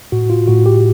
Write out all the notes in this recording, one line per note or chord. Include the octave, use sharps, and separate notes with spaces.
A2 F#4
F4
A2 F#4
G4